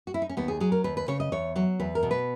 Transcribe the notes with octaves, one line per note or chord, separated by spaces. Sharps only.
F#4
E4
D#4
C#4
D#2 B3
G#4
F#3 G#4
A#4
D#2 B4
B4
C#3 C#5
D#5
E2 C#5
F#3 C#5
E2 B4
A#4
B2
B4